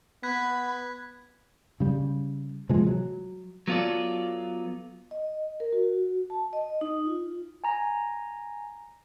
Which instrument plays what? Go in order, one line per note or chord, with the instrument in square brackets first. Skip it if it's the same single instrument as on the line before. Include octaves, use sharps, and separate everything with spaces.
[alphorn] B3 [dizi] B5 [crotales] F#6 G#6 B6
[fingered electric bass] C#3 G3
C3 E3 F3 G#3
F#3
[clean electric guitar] F#3 B3 F4 A4 D5
[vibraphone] D#5
A#4
F#4
A5
D#5
D#4
F4
[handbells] G#5 A#5 A#6